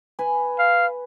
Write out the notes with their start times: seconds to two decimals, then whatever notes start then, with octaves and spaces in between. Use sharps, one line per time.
0.19 B4 G#5
0.59 F5